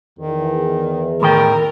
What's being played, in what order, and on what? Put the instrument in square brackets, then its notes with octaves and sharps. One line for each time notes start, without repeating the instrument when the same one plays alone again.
[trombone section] E2 [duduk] D#3
[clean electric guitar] A2 D#3 G5 [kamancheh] A#4